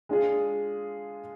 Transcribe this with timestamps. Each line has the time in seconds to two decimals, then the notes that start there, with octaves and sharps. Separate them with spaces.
0.09 G#3 D4 F4 G#4